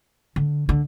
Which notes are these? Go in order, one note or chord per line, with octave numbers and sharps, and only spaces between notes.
D3
D3